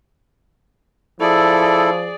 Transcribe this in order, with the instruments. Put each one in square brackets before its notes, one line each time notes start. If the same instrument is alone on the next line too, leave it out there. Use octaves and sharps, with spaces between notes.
[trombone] F3 [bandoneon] E4 A4 [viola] G#4 D5